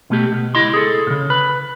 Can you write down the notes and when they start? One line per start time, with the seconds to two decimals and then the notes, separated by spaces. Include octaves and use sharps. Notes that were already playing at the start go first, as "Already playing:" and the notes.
0.10 B2 A3 G4
0.32 B2
0.55 C#2 E4 D#5 C6
0.74 G#4 A4
1.07 A#2 C#3
1.30 B4 B5